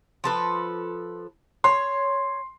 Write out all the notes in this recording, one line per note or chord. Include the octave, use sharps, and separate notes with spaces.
F3 A4 B4
C#5 C6